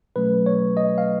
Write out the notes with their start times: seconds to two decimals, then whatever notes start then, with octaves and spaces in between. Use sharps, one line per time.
0.16 B2 F#3 A3 C#4 B4
0.46 C#5
0.77 D#5
0.98 F5